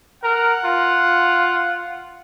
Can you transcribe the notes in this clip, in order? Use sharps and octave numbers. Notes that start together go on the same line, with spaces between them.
A#4 F#5
F4